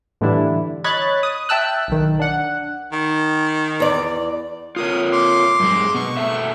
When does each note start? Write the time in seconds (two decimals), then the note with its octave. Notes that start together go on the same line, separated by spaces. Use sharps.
0.21 A2 D3 E3 G3 D4 E4
0.84 C#5 D#5 B5 F#6 G#6 A6
1.23 D#6
1.49 E5 G5 A5 E6 F#6
1.88 B1 D#3
2.20 D4 F#5
2.92 D#3
3.80 E2 D5
4.76 F4 A#4 C#5 D#6
5.12 C6 D6
5.60 F#2 G#3
5.95 B2 C#6
6.17 B2 A4 E5